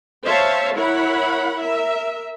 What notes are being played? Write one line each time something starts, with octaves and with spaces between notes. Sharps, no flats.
C5 C#5 E5 F5 A5
E4 A#4 C#5 F#5 B5
A#4 E5